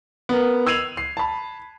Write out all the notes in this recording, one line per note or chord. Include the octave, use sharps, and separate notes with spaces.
B3 A#4
E6 G#6 C7 D#7 F7 F#7
C7
A5 B5